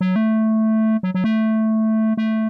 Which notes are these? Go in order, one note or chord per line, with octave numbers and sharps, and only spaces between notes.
F#3
A3
F#3
F#3
A3
A3